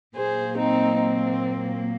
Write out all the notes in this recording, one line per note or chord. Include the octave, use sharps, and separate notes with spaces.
A#2 F#3 A#3 G#4 C5
C4 D#4
C4